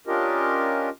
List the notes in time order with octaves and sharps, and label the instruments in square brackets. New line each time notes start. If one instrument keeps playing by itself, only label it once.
[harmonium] C#4 D4 F4 G4 A#4 D#5